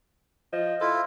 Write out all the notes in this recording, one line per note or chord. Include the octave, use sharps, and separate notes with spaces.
F3 D#5
E4 F4 A4